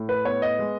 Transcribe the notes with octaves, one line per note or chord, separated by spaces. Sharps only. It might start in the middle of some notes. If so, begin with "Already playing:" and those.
Already playing: A2
B4
B3 C#5
D#5
G#3